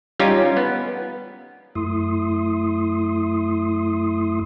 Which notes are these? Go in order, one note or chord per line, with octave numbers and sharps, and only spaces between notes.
G3 C#4 D#4 F4 G4 G#5
B3
F#2 A3 E4 C6 D#6